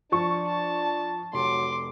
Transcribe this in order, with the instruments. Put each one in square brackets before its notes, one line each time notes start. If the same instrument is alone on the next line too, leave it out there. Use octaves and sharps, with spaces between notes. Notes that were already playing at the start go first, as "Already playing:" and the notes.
[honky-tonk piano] F3 C#6 [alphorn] D4 [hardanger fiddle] A5
[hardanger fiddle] A5
[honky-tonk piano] F1 [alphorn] F#3 [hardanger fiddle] C6 D6